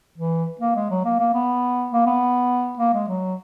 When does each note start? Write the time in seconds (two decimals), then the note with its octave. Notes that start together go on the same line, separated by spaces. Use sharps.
0.18 E3
0.61 A#3
0.76 G#3
0.91 F#3
1.05 A#3
1.19 A#3
1.34 B3
1.92 A#3
2.07 B3
2.79 A#3
2.94 G#3
3.08 F#3